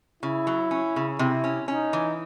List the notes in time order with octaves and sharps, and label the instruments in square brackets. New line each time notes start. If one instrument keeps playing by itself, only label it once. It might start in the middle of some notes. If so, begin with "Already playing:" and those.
[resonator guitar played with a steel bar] C#3 [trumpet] E4
[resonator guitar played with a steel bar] F#3
C#4
C#3
[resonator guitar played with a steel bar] C3 [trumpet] E4
[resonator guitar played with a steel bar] C#4
[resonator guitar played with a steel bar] C#4 [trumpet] D#4
[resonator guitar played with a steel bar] E3